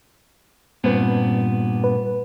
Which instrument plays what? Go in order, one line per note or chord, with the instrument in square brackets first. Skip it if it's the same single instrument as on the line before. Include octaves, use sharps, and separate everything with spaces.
[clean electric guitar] G2 A#2 B3 [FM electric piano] C4 B4
[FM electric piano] B4